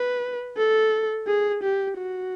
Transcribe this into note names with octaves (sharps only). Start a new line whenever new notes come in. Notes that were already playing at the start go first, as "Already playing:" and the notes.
Already playing: B4
A4
G#4
G4
F#4